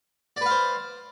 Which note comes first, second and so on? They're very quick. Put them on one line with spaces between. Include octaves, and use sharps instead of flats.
D5 B4 F5 C5